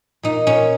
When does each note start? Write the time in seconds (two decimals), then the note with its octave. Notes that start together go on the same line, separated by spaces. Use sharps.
0.23 A#2 D#4
0.47 A#2 C#4